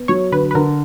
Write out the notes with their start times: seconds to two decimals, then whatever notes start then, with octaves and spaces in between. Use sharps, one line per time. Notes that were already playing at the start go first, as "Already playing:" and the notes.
Already playing: B3
0.08 F#3 C#5
0.32 D3 B4
0.51 B4
0.55 D3 A#4